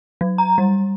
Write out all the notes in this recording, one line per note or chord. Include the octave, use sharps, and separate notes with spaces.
F#3
A#5
G3